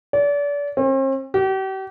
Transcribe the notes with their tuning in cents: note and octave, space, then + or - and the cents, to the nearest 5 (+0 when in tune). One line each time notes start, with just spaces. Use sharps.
D5 -35
C4 +45
G4 -40